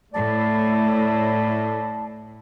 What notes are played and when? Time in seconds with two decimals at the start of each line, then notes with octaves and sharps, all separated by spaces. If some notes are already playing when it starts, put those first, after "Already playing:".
0.14 A2 A3 E4 D5 A5